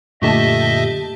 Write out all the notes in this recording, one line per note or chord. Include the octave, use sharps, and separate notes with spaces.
F#2 A#2 D3 A3 G4 D#5 E5 A5